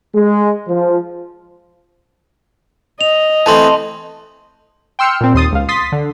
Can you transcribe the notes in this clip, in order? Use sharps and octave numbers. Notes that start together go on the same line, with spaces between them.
G#3
F3
D#5 F7
E3 A3 C4 A5 C6
G5 C6 E6 F6 C#7
A#2 C4
D#2 C6 D#6 A6
C#2 F5
C6 D#6 A6 B6
D3